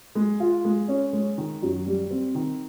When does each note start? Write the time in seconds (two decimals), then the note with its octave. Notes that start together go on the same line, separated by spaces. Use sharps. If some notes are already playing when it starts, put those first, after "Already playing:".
0.15 G#3
0.40 F4
0.65 G#3
0.88 C#4
1.13 G#3
1.38 D#3
1.62 F#2
1.87 G3
2.10 C4
2.35 D#3